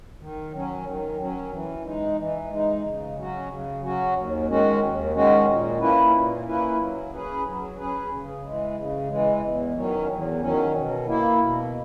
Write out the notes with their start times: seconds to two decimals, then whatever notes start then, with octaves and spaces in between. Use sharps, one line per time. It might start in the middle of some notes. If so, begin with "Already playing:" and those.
0.19 D#3
0.52 F#3 C#4
0.84 D#3
1.17 F#3 C#4
1.50 E3
1.83 G#3 D#4
2.17 E3
2.50 G#3 D#4
2.82 C#3
3.15 F#3 C#4 F#4
3.48 C#3
3.81 F#3 C#4 F#4
4.14 D#2
4.47 D#3 G#3 C#4 F#4
4.80 D#2
5.13 D#3 G#3 C#4 F#4
5.46 A#2
5.79 A#3 C#4 E4 B4
6.12 A#2
6.45 A#3 C#4 E4 B4
6.78 F#3
7.10 C#4 G#4 B4
7.44 F#3
7.77 C#4 G#4 B4
8.10 C#3
8.43 E3 G#3
8.76 C#3
9.09 E3 G#3
9.41 E2
9.74 D#3 F#3 C#4
10.08 E2
10.40 D#3 F#3 C#4
10.73 B2
11.07 A#3 E4
11.39 B2